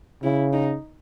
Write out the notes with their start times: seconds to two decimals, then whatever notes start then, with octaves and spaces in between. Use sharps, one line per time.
0.23 C#3 E4
0.53 D#4